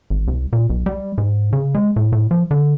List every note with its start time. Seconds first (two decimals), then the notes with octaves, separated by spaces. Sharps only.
0.10 G#1
0.28 C2
0.53 A#2
0.70 B1
0.86 G3
1.18 G#2
1.53 C#3
1.75 G#3
1.96 A2
2.12 A2
2.31 F3
2.51 D3